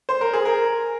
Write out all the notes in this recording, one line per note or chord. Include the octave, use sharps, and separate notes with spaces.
C5
A#4
G#4
A#4